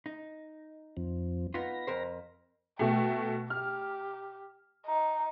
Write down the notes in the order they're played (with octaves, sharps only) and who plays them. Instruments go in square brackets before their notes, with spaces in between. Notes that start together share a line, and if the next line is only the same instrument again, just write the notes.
[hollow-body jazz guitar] D#4
[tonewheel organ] F2 F3 C4
[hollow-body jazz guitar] B3 D#4 F4 [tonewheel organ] B5 A#6
[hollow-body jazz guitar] F2 A#4 C5
[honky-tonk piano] B2 A3 [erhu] G5
[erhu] G4 [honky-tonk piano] F6
[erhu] D#4